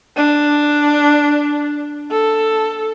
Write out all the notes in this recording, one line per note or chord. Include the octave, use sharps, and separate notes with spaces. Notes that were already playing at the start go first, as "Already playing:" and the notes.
D4
A4